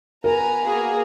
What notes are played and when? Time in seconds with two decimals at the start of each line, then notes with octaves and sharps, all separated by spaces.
0.24 B3 A#4 G#5 A#5
0.63 A#3 F#4 G#4 A#5